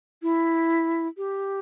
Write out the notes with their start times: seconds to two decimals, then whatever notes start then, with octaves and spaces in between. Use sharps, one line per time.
0.23 E4
1.17 G4